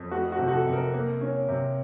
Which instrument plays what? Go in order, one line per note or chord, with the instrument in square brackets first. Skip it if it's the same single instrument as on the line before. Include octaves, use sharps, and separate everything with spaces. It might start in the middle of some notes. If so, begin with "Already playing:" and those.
Already playing: [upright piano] F2
A3 F#4
F#4
C3
F#4
A4
C3
A#4
A#3
C#4
C3